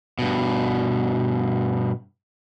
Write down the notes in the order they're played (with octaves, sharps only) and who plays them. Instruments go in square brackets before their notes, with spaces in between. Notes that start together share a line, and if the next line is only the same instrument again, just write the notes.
[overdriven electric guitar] G2 B2